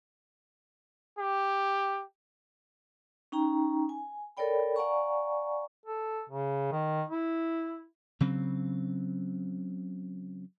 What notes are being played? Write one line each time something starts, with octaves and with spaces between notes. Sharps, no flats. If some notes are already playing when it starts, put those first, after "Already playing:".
G4
C#4 D#4 G5 A#5
G#5
A4 A#4 C#5 D5 G5 B5
D5 F5 F#5 G#5 A#5 C#6
A4
C#3
D#3
E4
C#3 F#3 C4